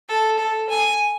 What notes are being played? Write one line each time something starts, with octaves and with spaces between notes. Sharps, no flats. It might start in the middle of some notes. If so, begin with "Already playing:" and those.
A4
A4
G#5